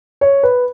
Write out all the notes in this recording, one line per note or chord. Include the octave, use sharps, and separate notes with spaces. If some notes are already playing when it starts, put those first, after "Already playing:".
C#5
B4